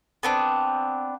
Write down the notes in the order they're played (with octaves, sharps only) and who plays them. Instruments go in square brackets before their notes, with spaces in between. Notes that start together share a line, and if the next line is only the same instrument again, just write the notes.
[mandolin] B3 C4 D4